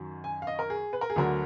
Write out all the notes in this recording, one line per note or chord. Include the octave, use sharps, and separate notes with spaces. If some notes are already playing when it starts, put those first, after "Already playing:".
Already playing: F#2 D#3 F#3
G#5
F5
D#5
A#4
G#4
B4
A#4
G#4
D2 D3 F#3 A#4